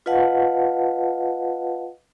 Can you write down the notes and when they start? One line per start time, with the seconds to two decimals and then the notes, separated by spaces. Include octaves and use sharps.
0.06 F4 B4 D#5 F5 F#5 A5